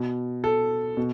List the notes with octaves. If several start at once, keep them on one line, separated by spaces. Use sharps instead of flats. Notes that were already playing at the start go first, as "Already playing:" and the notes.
Already playing: B2
A4
B2